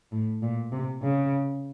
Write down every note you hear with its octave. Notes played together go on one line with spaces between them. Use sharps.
A2
A#2
C3
C#3